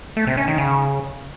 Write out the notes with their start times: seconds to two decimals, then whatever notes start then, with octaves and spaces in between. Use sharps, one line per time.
0.17 A3
0.27 C3
0.37 C#4
0.48 D#3
0.58 C#3